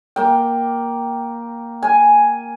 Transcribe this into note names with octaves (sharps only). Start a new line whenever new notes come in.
A#3 G5
G#5